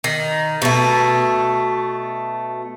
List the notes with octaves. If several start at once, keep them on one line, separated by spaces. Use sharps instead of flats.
D#3
B2 A3